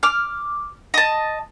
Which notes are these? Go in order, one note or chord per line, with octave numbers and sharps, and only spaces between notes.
D6 F6
D#5 A5